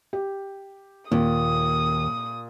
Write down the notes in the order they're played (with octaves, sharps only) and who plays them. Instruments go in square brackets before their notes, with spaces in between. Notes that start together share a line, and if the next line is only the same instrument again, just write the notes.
[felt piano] G4
[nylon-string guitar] D#2 [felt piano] A#2 [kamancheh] D#6